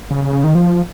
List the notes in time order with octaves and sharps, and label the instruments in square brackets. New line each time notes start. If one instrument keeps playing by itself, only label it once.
[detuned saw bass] C#3
C#3
C#3
D#3
F3